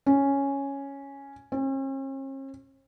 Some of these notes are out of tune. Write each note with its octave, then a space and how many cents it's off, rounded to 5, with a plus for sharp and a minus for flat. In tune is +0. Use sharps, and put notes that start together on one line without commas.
C#4 +0
C#4 -45